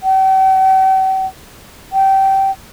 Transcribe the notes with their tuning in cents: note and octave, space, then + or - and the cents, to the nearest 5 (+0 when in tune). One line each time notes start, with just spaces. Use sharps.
G5 -45
G5 -20